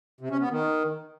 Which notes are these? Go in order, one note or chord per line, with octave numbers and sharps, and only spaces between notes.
C3
C#4
B3
D#3